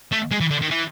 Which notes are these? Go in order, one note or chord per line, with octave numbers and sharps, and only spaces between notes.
A3
G#3
E3
D3
D#3
E3